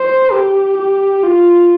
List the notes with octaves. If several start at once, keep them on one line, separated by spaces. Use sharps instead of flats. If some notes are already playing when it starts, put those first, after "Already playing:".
Already playing: C5
G4
G4
F4